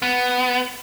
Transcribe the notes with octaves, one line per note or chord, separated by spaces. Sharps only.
B3